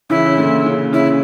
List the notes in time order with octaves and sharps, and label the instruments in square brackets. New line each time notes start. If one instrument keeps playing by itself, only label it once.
[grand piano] C#3 E3 [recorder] E4
[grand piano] C#3
A#2 D3
C#3
[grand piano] C#3 [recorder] E4